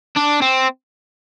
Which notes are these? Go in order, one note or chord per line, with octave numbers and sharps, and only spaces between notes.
D4
C4